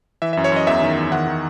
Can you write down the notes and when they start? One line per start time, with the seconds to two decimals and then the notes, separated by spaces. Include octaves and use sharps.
0.22 E3 E5
0.33 E5
0.37 F#2
0.44 C#5
0.52 F#2 D#5
0.67 E2 E5
0.82 D#3
0.98 E2
1.12 D#3 F#5
1.27 D#3